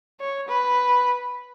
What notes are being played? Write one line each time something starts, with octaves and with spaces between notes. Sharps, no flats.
C#5
B4